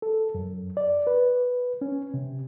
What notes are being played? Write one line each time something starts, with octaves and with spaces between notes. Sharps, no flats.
A4
F#2
D5
B4
C#4
C3